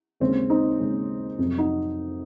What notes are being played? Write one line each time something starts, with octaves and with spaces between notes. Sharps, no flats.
D#2 C#3 G#3 C4
C4 D#4
D#2 C#3 G#3
F2 C3 F#3
D#4 F#4